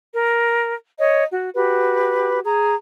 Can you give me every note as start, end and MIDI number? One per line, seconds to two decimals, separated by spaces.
0.15 0.74 70
0.99 1.23 73
0.99 1.23 75
1.31 1.49 66
1.54 2.39 66
1.54 2.39 67
1.54 2.39 71
2.44 2.74 68
2.44 2.74 82